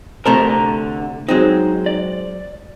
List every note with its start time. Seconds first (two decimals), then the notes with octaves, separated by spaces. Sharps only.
0.26 D2 C3 A3 A#4 A5 A#5
0.49 D3
1.29 F#3 G#3 C4 D#4
1.86 D5